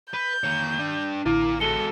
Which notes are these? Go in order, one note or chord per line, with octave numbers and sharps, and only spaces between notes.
B4 G6
D#3 A#3 C#5
D4 G5
A1 D3 E4 F4 D5
G#3 F#4 A4 C#7 G7